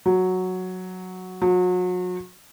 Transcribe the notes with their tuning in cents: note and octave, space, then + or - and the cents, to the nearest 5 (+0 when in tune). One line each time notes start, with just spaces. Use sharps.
F#3 -5
F#3 -35